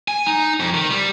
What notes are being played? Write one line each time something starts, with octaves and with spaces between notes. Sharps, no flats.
G#5
D#4
F2
D#3
G3